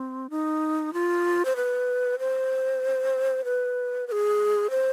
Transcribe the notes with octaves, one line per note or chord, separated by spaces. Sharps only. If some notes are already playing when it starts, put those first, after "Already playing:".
Already playing: C4
D#4
F4
C5
B4
C5
B4
B4
G#4
C5